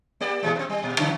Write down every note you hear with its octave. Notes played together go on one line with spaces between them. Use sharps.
A#3 G4 D5
A#2 E3 G#3
B3 C4
G3
A#2
C#3 E3 F#3